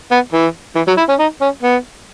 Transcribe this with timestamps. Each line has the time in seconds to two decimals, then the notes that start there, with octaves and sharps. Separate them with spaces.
0.11 B3
0.33 E3
0.75 E3
0.87 F#3
0.97 E4
1.09 C#4
1.19 D#4
1.41 C#4
1.63 B3